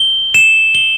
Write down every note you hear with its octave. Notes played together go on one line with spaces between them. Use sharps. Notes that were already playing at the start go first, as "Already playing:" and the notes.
Already playing: G7
E7
G7